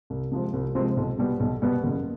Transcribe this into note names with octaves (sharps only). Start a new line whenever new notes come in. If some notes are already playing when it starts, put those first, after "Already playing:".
C2
C3 F3 G#3 C4
C2
C3 F3 G#3 C4
B1
B2 G3 B3
B1
B2 G3 B3
F#1